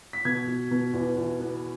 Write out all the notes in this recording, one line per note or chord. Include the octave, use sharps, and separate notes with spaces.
B6
B2 G#6
B2
B2
E2
E2
B3